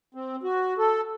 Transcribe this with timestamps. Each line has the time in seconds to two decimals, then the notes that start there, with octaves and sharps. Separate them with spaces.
0.14 C4
0.43 F#4
0.78 A4